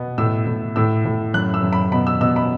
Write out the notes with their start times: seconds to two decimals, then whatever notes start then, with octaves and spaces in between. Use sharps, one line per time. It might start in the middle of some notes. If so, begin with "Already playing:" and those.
Already playing: B2 B3
0.18 A2 E6
0.47 A2
0.76 A2 E6
1.05 A2
1.34 F#2 F#6
1.54 E6
1.63 F#2
1.73 B5
1.92 B2 B5
2.07 E6
2.21 B2 E6
2.36 B5